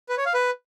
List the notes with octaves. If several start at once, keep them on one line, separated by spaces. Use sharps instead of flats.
B4
C#5
F5
B4